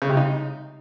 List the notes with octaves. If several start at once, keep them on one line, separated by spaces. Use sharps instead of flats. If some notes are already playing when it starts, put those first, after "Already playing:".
C#3
C3
D#4